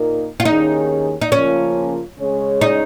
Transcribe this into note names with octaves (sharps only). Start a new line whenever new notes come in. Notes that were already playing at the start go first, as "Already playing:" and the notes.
Already playing: A#2 A#3 D#4 A#4
F4
D#2 D#3 C#4 D#4 G#4 C#5
D#4
C#3 F3 A#3 C#4 F4 A#4
C#3 G#3 C#4 G#4 C#5
D#4